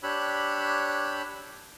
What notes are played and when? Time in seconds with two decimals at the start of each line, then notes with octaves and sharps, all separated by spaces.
0.03 D4 G4 C#5 B5 E6 F#6